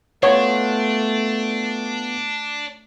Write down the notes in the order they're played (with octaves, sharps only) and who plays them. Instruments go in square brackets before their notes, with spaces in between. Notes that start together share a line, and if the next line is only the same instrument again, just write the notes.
[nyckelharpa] A3 [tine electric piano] B3 F4 [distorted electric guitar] D4 [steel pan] C#5